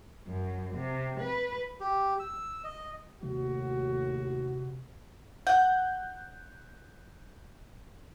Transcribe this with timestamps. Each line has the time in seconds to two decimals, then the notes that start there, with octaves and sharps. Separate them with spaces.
0.27 F#2
0.75 C3
1.20 B4
1.80 G4
2.20 E6
2.64 D#5
3.23 D#2 A2 C3 F#4
5.47 F#5 F#6 G6